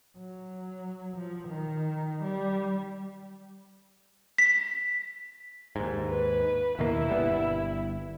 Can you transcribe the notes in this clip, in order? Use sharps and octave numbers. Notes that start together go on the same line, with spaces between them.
F#3
F3
D#3
G3
B6
D#2 G#2
B4
D#2 B2 A#3 E4
G1 G3 B3